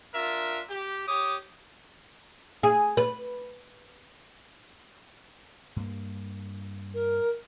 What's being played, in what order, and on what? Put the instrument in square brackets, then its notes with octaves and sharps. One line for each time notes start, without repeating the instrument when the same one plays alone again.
[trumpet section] D4 F4 A#4 E5
G4
G4 C#5 D6 D#6
[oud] G#4
B4
[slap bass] G2 A#3
[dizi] A#4